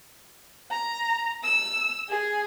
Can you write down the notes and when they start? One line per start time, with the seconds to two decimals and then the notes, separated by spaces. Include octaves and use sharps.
0.70 A#5
1.43 E6
2.08 G#4